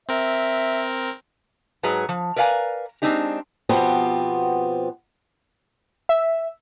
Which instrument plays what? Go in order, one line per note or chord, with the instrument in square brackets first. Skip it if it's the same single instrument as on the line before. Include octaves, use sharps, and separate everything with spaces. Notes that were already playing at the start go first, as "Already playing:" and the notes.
[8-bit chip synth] C4 A#4 [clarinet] E5
[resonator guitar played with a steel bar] G#2 F#3 G#4 B4 A#5
F3
A#4 B4 D5 F5 G#5 A#5
G#3 C4 D4 D#4 G4
[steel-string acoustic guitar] B2 F3 B3 C4 G4
[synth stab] E5